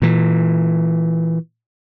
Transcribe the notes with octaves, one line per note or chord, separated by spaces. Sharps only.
A#2 E3